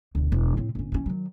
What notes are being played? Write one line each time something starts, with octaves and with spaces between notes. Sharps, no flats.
E1 D2
E1 E3
A2 C4
G1 C#4
E3 C#4
D#3 F#3